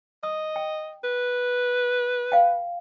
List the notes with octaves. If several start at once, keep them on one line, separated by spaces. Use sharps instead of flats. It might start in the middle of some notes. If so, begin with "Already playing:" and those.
D#5 D#6
G5
B4
F5 G5